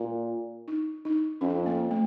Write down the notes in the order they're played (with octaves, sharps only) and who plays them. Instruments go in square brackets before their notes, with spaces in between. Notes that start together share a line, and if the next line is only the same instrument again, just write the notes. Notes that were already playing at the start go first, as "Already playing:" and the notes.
Already playing: [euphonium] A#2 [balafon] F4
[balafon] D#4
D#4
[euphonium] F2 [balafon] C#4
[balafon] A#3
A3